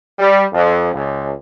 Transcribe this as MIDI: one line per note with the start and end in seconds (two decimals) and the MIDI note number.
0.19 0.44 55
0.53 0.90 41
0.93 1.32 37